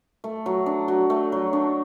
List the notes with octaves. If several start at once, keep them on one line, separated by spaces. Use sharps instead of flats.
A3
F#3
D4
F#3
A3
F#3
D4